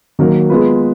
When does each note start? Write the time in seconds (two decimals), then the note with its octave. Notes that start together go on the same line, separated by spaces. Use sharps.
0.19 D#3 F#3 A#3
0.50 G#3 B3 F4 B4